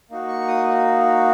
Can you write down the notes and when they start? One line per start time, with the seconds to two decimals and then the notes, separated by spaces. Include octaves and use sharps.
0.10 A#3 D#4 F#4
0.28 C#6
0.48 D#6